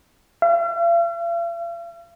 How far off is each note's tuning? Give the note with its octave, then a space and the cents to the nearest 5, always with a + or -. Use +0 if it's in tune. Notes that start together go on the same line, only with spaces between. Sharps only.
F5 -45